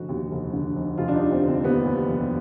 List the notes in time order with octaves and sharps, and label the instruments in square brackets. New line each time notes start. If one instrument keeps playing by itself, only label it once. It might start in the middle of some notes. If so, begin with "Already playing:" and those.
Already playing: [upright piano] F1 D3 F#4
D#2
F1
D3
F1
F1 F4
D4
D#4
G3
C4
D3
C4
D#2 B3
D#2
F1